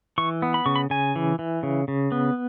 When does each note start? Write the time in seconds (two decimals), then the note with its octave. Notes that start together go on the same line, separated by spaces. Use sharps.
0.18 E3 C#6
0.42 B3
0.54 B5
0.66 C#3 C#6
0.76 B5
0.90 C#3 G#5
1.16 E3
1.39 E3
1.63 C#3
1.88 C#3
2.12 B3